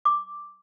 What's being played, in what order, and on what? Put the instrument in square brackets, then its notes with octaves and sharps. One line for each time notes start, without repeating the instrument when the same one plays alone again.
[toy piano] D6